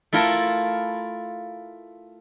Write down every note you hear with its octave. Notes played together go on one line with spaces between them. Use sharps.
A3 E4 F4 A4 A#4